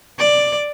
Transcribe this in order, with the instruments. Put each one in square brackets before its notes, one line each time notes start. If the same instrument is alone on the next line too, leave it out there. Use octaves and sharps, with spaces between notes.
[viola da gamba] D5